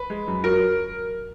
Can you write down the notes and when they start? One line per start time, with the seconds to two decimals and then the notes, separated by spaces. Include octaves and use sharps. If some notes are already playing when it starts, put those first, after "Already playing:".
Already playing: B4
0.10 G#3
0.27 F#2
0.44 F#3 A#4